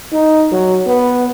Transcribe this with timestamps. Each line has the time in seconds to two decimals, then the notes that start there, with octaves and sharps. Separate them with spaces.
0.13 D#4
0.52 F#3
0.86 B3